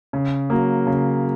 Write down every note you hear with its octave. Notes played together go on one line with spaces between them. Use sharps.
C#3
F#3 A#3
C#3